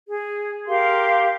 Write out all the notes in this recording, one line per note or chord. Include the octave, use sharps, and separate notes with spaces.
G#4
G4 A#4 F5 C6